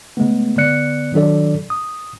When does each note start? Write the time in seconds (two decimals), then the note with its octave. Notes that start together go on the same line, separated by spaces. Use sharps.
0.17 C#3 G#3 A3 B3
0.57 D3 B3 D5 F#6 C#7
1.13 D#3 F#3 D4 A4 D5
1.70 D#6